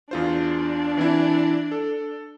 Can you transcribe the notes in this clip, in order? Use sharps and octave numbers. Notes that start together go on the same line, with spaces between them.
E2 D4 F4 C5
E3 C4 E4
A4